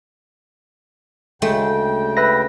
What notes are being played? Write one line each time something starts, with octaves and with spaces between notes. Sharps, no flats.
D2 C#3 G#3 A3 G5
B4 E5 A#6